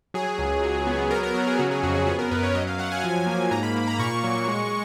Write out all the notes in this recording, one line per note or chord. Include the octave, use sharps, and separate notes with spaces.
F#3 G#4
C#2
F#3
B3
F#3 A#4
A#4
F#3 A#4
G#4
C#3 F#4
G#4
F2 F#4
G#4
B3 G#4
A#4
F#2 B4
C#5
F#3 D#5
F5
F#3 F#5
G#5
F3
A#3
G#2 A#5
B5
A#3
A#5
A#2 C#6
F#3
G#3